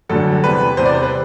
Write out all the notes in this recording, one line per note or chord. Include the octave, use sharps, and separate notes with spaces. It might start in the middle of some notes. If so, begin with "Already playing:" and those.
G1 F#2 D3 G3 A4
E2 C3 G3 B4
E2 C3 G3 C5
D5
C5
B4